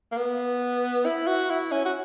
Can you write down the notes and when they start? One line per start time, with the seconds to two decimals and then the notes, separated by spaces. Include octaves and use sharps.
0.12 A#3
0.17 B3
1.06 E4
1.27 F#4
1.50 E4
1.72 C#4
1.85 F#4